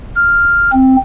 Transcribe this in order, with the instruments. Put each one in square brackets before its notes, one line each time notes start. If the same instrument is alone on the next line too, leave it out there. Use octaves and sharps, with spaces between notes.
[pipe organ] F6
C4